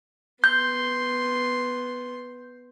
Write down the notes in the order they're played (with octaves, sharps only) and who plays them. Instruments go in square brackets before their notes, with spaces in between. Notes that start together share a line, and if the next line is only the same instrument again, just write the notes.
[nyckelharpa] B3 C6 [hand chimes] G6